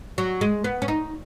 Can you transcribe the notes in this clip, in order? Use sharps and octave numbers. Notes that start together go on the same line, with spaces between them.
F#3
G#3
B3
C#4
D#4